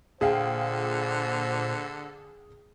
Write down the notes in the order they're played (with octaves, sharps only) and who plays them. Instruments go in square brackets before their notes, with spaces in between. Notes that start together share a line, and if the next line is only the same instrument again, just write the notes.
[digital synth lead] A#2 [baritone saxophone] D3 [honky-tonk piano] G#4 F5 G5 [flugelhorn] C5